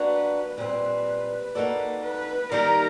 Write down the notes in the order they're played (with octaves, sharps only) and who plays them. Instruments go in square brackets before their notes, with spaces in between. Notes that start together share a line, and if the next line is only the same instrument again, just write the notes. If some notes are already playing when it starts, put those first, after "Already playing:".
Already playing: [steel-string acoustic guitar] A#3 D4 F#4 [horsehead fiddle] B4
[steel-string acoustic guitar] A#2 G3 C4 [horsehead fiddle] B4
[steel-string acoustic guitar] A#3 D#4 F#4 A4 D5
[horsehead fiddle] B4
[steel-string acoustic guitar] D#3 G3 A#3 D#4 G4 [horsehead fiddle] A#4